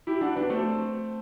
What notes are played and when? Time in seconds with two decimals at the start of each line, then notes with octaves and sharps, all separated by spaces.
0.07 E4 G4
0.21 D4 F#4
0.36 B3 D4
0.50 A3 C4